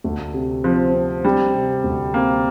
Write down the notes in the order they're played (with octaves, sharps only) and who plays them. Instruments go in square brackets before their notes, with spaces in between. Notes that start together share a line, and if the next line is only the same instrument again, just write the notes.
[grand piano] D2
C3
[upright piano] F3 [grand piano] C4
[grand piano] C4
[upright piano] G3 [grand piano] C4
[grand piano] C3
D2
[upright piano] A#3 [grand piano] C4